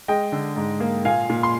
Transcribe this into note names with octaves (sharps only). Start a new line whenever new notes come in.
G#3 D#5 G5
D3
G#2
A#3
A#2 F5 G#5
A#2
C6